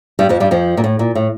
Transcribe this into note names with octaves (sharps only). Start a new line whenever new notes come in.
G2 G3
F2 F3
G2 G3
F2 F3
A#2
A2
A#2
A2